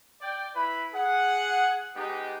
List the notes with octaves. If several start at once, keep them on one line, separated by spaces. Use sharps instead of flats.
D5 G5
E4 B4 B5
G#4 F#5
G#3 B3 D#4 G4